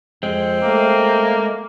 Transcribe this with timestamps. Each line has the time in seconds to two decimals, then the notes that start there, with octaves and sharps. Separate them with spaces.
0.23 F2 G#3 C4
0.63 A3 A#3